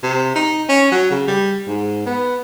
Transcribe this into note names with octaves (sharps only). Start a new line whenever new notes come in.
C3
D#4
C#4
F#3
C#3
G3
G#2
B3